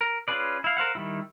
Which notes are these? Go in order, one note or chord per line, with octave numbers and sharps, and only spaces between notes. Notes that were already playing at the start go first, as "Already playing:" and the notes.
A#4
C#4 F4 G#4 B4 D5
E4 F5
A#4 C5 F5 F#5
D#3 G3 E4